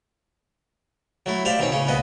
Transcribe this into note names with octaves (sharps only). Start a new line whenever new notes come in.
F#3 A3 E4
G4 C5 D5 E5 F5
B2 D#3 C4 C#4
A2 C#3 C#4
C2 A#2 B3 B4 D#5